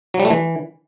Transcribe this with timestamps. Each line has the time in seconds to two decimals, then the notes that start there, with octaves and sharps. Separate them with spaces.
0.14 F#3
0.20 G3
0.25 A3
0.30 E3